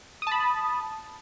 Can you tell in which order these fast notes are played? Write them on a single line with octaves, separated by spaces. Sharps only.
D#6 A5 B5